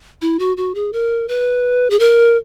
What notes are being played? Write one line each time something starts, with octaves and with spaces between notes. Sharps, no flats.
E4
F#4
F#4
G#4
A#4
B4
G#4
A#4